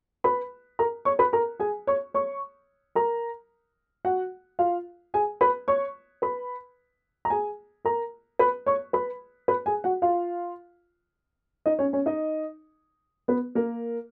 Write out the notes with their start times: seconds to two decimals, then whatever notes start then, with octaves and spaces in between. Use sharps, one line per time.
0.24 B4 B5
0.79 A#4 A#5
1.05 C#5 C#6
1.19 B4 B5
1.33 A#4 A#5
1.60 G#4 G#5
1.87 C#5 C#6
2.14 C#5 C#6
2.95 A#4 A#5
4.05 F#4 F#5
4.59 F4 F5
5.14 G#4 G#5
5.41 B4 B5
5.68 C#5 C#6
6.22 B4 B5
7.25 A#5
7.30 G#4 G#5
7.85 A#4 A#5
8.39 B4 B5
8.66 C#5 C#6
8.93 B4 B5
9.48 B4 B5
9.66 G#4 G#5
9.84 F#4 F#5
10.02 F4 F5
11.66 D#4 D#5
11.79 C#4 C#5
11.93 C#4 C#5
12.06 D#4 D#5
13.28 B3 B4
13.55 A#3 A#4